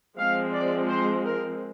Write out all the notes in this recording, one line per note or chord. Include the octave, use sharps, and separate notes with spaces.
F3 G#3 C4 F5
D5
C5
A#4